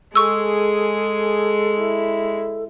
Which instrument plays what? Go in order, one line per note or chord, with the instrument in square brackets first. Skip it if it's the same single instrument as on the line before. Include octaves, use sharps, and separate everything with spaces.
[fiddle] G#3 [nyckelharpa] G#4 [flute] A4 [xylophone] C#6 E6
[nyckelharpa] E4